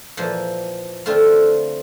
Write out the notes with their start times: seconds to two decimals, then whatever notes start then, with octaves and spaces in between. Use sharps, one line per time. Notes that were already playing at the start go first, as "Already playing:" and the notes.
0.17 A#2 E3 F3
1.06 D3 A3 C4 F4